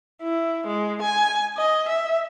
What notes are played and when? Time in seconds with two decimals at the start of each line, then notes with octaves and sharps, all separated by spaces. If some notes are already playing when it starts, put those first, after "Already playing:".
0.22 E4
0.67 G#3
1.02 G#5
1.57 D#5
1.89 E5